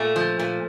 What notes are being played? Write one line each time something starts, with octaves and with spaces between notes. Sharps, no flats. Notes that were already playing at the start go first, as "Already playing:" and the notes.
Already playing: A#2 A3
F3
A#2